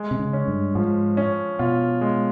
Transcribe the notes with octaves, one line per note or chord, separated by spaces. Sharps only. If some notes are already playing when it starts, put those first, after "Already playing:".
Already playing: G#3
C3
C#3
C#4
G2
G#2 F3
C#4
B2 F4
G#3